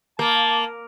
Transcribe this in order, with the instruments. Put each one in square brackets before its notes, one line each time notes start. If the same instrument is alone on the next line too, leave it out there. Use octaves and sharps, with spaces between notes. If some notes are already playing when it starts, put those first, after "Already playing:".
[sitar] A#3 [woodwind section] A5